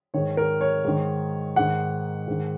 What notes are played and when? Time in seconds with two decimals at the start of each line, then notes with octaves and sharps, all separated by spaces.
0.14 G#2 D#3 C#5
0.37 A#4
0.61 C#5
0.84 G#2 D#3
1.56 G#2 D#3 F#5
2.28 G#2 D#3